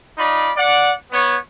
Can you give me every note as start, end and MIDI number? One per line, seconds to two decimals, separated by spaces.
0.18 0.51 63
0.18 0.51 65
0.18 0.51 74
0.18 0.51 83
0.57 0.92 74
0.57 0.92 78
1.12 1.38 59
1.12 1.38 73